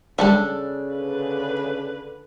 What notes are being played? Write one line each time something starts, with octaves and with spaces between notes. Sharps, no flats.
C#3 G3 D4 A4 E5
D3 B4